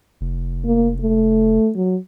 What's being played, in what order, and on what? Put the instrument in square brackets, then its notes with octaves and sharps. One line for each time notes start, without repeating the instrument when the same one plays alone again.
[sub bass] F1
[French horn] A#3
A3
F#3